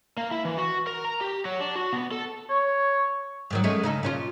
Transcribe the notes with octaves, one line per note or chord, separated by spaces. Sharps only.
A#3
E4
E3
F#4
A#4
A#5
G4
F#3
D4
F#4
B3
A4
C#5
G#2 D#3 F#3
G#3 A3 C#4
C#3 D#4 A4
A#2 C#4 F4